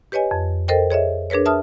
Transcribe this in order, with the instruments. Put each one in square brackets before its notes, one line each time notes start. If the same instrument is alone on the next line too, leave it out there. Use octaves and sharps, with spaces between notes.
[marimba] G4 B4 C#5 D#5 G#5
F2
A4 A#4 C5 D#5 G5
G#4 C#5 D#5 E5
D4 G#4 A#4 B4 C#5
E5 A5 D#6 F6